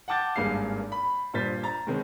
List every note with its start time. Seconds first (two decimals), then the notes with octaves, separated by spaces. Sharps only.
0.08 F#5 G5 A5 D6 G6 A6
0.36 G#1 G2 A#3 G#4 F5 C7
0.92 B5
1.34 G2 A#2 C5 A6 B6
1.63 A#5 A6
1.87 B2 D#3 G#3 C4 C#4